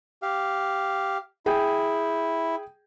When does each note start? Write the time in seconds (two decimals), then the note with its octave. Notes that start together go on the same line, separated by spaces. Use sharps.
0.22 G4 F5
1.46 E4 G#4 G5